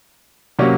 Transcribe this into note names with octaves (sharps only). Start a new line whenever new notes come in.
C3 F#3 A#3 C#4